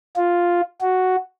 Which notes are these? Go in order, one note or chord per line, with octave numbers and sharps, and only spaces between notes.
F4
F#4